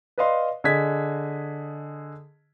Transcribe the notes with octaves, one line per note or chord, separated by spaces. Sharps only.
B4 D5 D#5 F5 C6
D3 G#4 D#5 G#6 B6